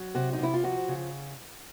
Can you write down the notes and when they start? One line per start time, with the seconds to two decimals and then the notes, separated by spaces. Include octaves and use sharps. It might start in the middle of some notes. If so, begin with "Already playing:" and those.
Already playing: F#3
0.15 C3 F#4
0.33 D#4
0.39 C3 E4
0.54 F4
0.63 F3 F#4
0.88 C#3